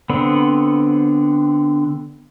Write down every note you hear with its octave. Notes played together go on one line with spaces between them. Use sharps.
D3 B3 C4